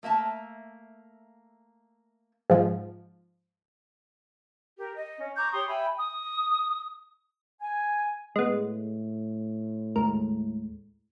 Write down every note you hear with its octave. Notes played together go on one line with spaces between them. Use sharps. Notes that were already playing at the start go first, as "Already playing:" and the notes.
A3 A#3 E5 A5
G#2 F3
G4 A#4
D#5
C#4
A#5 C#6 D6 G6
G4 C#5 C6 D#6
E5 G5 G#5 B5
D#6
G#5
A2 G#3 B3
D#2 G#3 A3 A#4